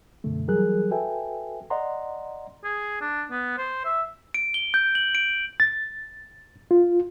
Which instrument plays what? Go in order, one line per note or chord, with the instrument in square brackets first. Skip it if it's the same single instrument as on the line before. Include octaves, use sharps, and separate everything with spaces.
[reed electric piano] F#2 B2 D3 A3
E3 F#3 G3 G#4 A#4 F#6
F#4 A4 B4 E5 G5 G#5
D5 D#5 F#5 A#5 C6
[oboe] G#4
D4
B3
C5
E5
[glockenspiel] D7
G7
G6
F#7
D7
[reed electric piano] A6
F4